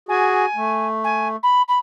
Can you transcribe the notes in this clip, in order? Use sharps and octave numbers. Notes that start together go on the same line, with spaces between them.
F#4 G#4 G#5
A3
G#5
B5
B5